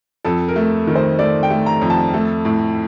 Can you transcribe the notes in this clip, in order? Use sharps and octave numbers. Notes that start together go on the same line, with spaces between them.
F2 A4
A#4
A3
D#3
C5
A3 D5
G5
A3
A#5
F2
A5
A3
A2